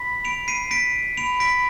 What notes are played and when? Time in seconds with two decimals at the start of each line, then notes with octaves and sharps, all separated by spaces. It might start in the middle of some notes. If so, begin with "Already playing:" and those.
Already playing: B5 B6
0.25 D7 F7
0.48 C7 D#7
0.71 B6 D7
1.17 B5 D7 F7
1.40 B6 D7